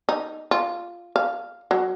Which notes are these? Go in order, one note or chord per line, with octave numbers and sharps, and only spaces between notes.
D#4
F4
F5
F#3